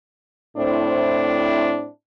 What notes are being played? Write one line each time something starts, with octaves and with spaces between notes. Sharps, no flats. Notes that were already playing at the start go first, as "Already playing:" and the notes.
A2 C4 D4 E4 C5